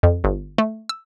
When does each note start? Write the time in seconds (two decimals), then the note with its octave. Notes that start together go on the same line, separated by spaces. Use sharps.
0.03 F2
0.24 G1
0.58 A3
0.89 E6